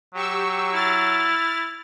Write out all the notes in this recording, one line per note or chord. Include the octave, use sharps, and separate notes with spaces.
F#3 G4 C#6 E6
E4 F6 A6